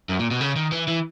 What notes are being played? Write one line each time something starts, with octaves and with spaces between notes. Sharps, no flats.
F#2
A#2
B2
C#3
D#3
E3
E3